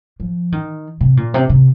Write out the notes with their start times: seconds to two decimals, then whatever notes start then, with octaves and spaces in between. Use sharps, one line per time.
0.20 F3
0.52 D#3
1.01 C3
1.17 A#2
1.34 C3
1.49 C3